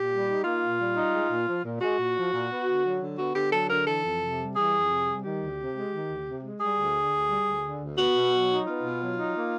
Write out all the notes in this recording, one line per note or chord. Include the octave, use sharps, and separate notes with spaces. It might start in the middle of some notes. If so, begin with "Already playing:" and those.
Already playing: A#2 G4
G3
D#4
A#3 F4
A#2
G3
D#4
G#3
A#2
F3
A#2
G#3 F#4
A#2
F3
A#2
B3
D3
F#3
D3
B3 F#4
D3 G4
F#3 A4
D3 A#4
E3 A4
F2
C3
G3
E3 G#4
F2
C3
G3
D#3 G4
D2
C3
G#3
D#3
D2
C3
G#3
G3 G#4
D2
D3
D2
G3
D2
D3
D2
B3 F#4
B2
F#3
D#4
B3 F4
B2
F#3
D#4
A#3